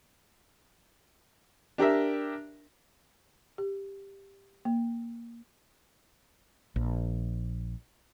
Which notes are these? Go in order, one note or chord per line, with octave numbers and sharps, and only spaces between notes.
D4 G4 A#4 E5
G4
A#3
A#1